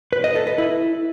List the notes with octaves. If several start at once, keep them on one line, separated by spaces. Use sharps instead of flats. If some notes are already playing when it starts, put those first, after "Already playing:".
B4
D#5
A4
B4
E4